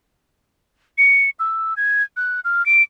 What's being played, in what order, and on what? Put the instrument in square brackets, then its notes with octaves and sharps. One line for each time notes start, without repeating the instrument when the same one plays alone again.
[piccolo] C#7
E6
G#6
F#6
F6
D7